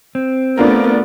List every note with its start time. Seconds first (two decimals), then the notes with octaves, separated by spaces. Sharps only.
0.15 C4
0.58 A3 B3 D4 F4 A#4